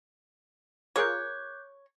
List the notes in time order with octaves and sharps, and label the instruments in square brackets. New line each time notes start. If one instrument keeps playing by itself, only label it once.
[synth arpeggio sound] F4 G#4 A#4 [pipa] C#5 [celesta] D6 F#6 G6